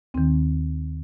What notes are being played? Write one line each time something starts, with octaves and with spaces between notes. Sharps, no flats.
D#2 D#3 C4